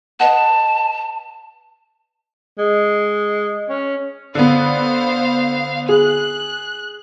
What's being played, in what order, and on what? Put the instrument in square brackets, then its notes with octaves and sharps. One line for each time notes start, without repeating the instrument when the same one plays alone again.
[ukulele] B4 D#5 F#5 [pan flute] A5
[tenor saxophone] G#3
C#4
[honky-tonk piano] D3 B3 [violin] C5 F5
[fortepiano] G#4 [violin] F#6